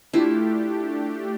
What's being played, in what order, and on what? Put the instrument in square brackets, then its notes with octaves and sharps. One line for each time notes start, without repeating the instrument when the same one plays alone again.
[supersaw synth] A3 D4 G4 [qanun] E4 F4